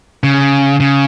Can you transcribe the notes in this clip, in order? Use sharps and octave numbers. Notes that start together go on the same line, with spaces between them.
C#3
C#3